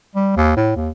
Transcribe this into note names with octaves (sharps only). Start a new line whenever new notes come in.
G3
D#2
A2
D#2